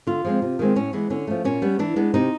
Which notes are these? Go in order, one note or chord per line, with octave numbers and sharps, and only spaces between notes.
D3 F4
F3 G#3 C4
C3
D#3 G#3 C4
A2 C#4
E3 G#3 B3
D3 C#4
F3 A3
A#2 C#4
G3 B3
E3 D4
G#3 B3
C3 D#4